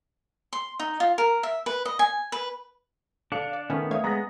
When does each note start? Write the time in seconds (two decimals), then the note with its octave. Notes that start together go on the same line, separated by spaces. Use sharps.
0.53 C6
0.79 D#4
1.00 F4
1.18 A#4
1.43 E5
1.66 B4
1.85 D#5
1.99 G#5
2.32 B4
3.32 D3 D4 F5 C#7 F7
3.53 D5
3.70 D#3 A3 B3 C#4
3.91 A3 C#5 F5 D#6 G#6
4.04 G#3 B3 A#5 D#6 A#6